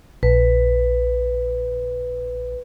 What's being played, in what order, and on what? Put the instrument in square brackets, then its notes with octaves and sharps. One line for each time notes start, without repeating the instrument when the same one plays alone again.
[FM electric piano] A#1 [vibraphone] B4